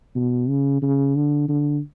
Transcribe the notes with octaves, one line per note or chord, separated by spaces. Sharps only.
B2
C#3
C#3
D3
D3